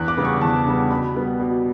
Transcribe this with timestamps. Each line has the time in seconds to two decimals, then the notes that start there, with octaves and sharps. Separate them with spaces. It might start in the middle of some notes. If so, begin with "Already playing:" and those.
Already playing: E2 F#6
0.08 D6
0.17 C#3 G3 B3
0.25 C#6
0.41 E2 A5
0.66 C#3 G3 B3
0.90 B2 B5
1.15 G3 B3
1.40 B2